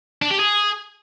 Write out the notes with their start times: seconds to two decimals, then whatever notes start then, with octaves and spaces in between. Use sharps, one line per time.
0.22 D4
0.31 G4
0.40 G#4